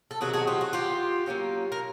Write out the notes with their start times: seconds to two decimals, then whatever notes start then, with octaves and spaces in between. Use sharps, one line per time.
0.11 A4
0.20 C3 D#3 F#3 F#4 G#4
0.33 F#4 G#4
0.47 F4 G4
0.61 F#4
0.73 F4 G4
1.26 F#3 A#3 C#4 F4
1.72 A#4